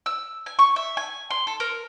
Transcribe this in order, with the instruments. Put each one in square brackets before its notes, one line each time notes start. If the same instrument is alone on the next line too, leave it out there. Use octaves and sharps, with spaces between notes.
[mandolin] E6
G#5
C#6
E5
G#5
C6
A4
A#4